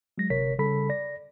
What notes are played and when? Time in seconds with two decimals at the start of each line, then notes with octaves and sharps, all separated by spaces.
0.18 F#3 G#3 A#6
0.30 G1 C3 A#4 C#5 B6
0.59 C#3 G3 A4 B5 B6
0.90 D5 A#6